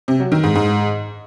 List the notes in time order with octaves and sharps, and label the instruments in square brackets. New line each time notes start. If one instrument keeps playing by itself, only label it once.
[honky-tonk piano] C3
F#3
D#3
G#2
G#2